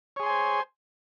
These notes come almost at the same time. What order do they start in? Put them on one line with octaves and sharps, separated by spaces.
C#5 G#4 C6 G#5 C5